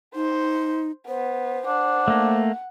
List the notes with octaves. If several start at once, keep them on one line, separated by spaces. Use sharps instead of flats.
D#4 C5
B3 C5
D4 F#5
A3 A#3